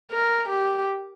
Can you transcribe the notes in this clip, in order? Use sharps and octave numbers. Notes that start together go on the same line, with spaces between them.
A#4
G4